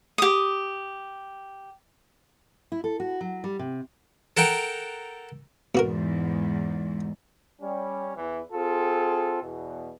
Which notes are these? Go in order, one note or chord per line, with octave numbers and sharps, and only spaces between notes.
G4 D#6
E4
A4
F#4
F#3
G3
C3
A4 A#4 F#5 G5 A#5
E2 G#2 B2 F#4 A#4
G3 C#4
E2 E3
C4 F4 G#4 A4
E2 B2